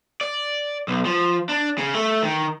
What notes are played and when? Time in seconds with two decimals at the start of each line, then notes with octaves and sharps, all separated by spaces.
0.21 D5
0.88 B1
1.05 F3
1.49 D4
1.78 C#3
1.95 A3
2.23 D#3